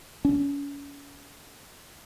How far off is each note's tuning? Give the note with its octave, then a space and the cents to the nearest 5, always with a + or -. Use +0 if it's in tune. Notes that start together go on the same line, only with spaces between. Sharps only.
C#4 +40